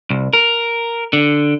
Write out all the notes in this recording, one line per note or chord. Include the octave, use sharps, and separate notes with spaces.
C2
A#4
D3